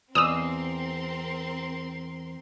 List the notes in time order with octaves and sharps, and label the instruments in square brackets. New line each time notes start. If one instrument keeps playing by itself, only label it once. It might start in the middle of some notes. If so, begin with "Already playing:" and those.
[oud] E2 [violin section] C4 A#4 C6 [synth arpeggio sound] D#6 E6